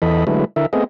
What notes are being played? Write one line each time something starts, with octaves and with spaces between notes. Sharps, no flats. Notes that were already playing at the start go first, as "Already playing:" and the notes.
E2 E3 A4 D#5 B5
D3 F#3 G#3 A3 E4 B4
D3 E4 A#4 E5
A3 B3 C4 G#4 D#5